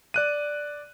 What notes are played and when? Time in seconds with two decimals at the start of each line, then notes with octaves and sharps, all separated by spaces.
0.14 D5 F#6 D#7